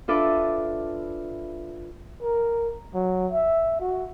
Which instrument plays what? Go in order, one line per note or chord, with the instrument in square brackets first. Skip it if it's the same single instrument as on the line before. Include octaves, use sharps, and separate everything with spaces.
[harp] D4 F4 A4 B4 E5 D6
[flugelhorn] A#4
F#3
E5
F#4